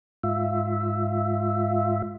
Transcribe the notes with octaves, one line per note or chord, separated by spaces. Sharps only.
G#2 F4 E5